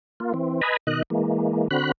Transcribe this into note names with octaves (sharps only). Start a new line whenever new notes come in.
A#3 F4
E3 C4
B4 D#5 G#5 A#5 B5
B2 D#3 D#5 F#6
E3 G#3 A#3
D3 C4 F#4 B5 F#6